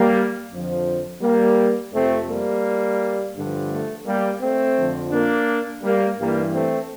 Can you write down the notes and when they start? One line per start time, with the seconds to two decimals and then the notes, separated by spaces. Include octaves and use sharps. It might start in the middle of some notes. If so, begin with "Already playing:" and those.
Already playing: G3 A#3
0.52 F2 D3 F3
1.22 G3 A#3
1.93 F2 C3 F3 A3 C4
2.29 G3 A#3
3.35 G2 D3 F3
3.71 A3
4.06 G3 A#3
4.41 A3 C4
4.77 F2 D3 F3
5.12 A#3 D4
5.83 G3 A#3
6.19 G2 E3 G3 A#3
6.54 A3 C4